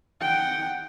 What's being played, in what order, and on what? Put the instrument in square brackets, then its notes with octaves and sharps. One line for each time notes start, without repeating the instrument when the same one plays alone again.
[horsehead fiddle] F#5 G5